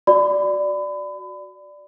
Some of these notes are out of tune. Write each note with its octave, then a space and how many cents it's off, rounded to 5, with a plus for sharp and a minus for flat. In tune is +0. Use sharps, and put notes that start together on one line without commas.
F#4 +0 D5 +0 B5 +30